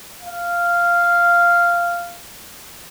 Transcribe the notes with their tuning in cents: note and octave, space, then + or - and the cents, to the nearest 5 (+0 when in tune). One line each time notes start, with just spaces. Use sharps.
F5 -10